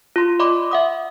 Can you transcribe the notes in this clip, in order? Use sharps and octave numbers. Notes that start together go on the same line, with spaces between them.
F4 C6
D5 D#5 B5 C6 D6
E5 F#5 D#6